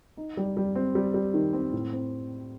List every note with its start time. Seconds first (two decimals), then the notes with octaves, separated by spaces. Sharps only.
0.17 D#4
0.37 G3
0.57 G3
0.75 C4
0.95 G3
1.14 G3
1.34 D#3
1.53 C4
1.73 A2
1.93 C4